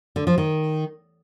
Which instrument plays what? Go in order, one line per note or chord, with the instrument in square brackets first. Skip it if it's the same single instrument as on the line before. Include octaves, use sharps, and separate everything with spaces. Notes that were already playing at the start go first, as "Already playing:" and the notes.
[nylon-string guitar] D3
F3
D#3